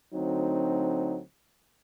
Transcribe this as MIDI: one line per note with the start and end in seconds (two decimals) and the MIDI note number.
0.14 1.20 38
0.14 1.20 54
0.14 1.20 60
0.14 1.20 63